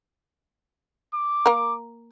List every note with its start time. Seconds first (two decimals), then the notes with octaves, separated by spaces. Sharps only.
1.14 D6
1.46 A#3 A#4